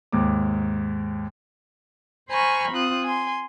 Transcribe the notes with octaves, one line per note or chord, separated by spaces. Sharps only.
D#2 G#2 D6
C5 G#5 A#5 B5 C#6 F6
C4 F4 D#6 F#6
G#5 C6